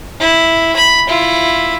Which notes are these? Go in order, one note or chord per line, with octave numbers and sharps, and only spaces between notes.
E4
B5
E4 F4